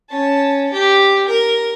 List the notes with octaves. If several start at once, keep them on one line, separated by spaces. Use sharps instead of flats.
C#4 A5
G4
A#4